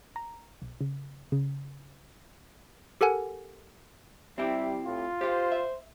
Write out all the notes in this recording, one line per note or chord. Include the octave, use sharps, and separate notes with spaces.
A#5
B1
C#3
C#3
G4 A4 A#4 F#5 G#5
G3 C4 E4 G4 E5
A2 F4
G4 C5 F5
E5